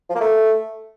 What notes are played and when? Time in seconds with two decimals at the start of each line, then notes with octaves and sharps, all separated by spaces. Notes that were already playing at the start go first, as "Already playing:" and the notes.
0.10 F3
0.15 A#3
0.21 A3